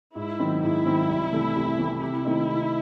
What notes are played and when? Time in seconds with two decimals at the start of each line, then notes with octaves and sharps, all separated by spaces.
0.16 G#2 E4
0.39 D#3 F#3 C4
0.62 G#2 E4
0.86 D#3 F#3 C4
1.09 C2
1.32 C3 E3 A3
1.55 C2
1.79 C3 E3 A3
2.01 C3 E4
2.25 D#3 A3 C4 D#4
2.48 C3